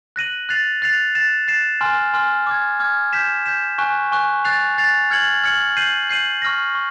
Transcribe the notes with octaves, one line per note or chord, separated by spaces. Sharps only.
F#6 A#6 D#7 F#7
F#6 A6 C7 F7
F#6 A6 C7 F7
F#6 A6 C7 E7
F#6 A6 C7 E7
G#5 C6 F6
G#5 C6 F6
D6 F6 G#6
D6 F6 G#6
G6 B6 E7
G6 B6 E7
G#5 C#6 F#6
G#5 C#6 F#6
F#6 A6 C7 F7
F#6 A6 C7 F7
F6 G#6 C#7 F#7
F6 G#6 C#7 F#7
G6 C7 D#7 F#7
G6 C7 D#7 F#7
C#6 F6 A#6
C#6